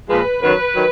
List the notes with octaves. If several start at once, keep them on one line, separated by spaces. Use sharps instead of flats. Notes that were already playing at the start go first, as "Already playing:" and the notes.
A#2 F3 G#3 B4
F#2 D#3 F#3 B4
D#3 F#3